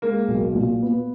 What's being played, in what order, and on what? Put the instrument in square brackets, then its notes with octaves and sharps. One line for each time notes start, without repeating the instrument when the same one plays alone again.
[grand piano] G#3 [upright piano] A#3
[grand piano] B1
A#2
B3